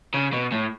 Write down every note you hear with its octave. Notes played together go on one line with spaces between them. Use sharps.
C#3
B2
A2